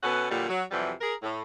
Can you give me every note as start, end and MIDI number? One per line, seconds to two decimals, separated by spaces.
0.03 0.29 47
0.03 0.29 59
0.03 0.29 61
0.03 0.29 69
0.03 0.29 78
0.31 0.46 46
0.31 0.46 50
0.31 0.46 54
0.31 0.46 55
0.49 0.63 54
0.71 0.91 41
0.71 0.91 48
0.71 0.91 52
0.71 0.91 54
0.71 0.91 55
1.01 1.14 68
1.01 1.14 70
1.23 1.42 45